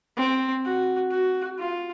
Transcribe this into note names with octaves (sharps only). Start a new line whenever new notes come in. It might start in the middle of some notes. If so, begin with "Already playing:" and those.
C4
F#4
F#4
F4